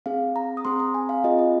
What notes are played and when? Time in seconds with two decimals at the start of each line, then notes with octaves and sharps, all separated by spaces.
0.06 C4 G#4 F5
0.36 A#5
0.57 D#6
0.65 C4 G#4 C6
0.80 A#5
0.94 G#5
1.09 F5
1.24 C4 F4 G#4 D#5
1.39 D#5